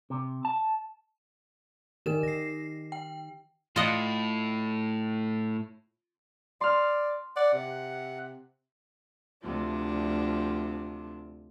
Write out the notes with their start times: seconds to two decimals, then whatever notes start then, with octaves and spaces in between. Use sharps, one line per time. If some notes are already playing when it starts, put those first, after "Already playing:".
0.10 C3
0.45 A5
2.06 D#3 D#4 G4 A#4 E7
2.23 D#3 A#6 C7
2.92 G5
3.76 A2 F4 D#5 F#5
6.61 D5 C6 F6
7.36 D5 F#5
7.53 C3
9.42 D2 C3 F3 D4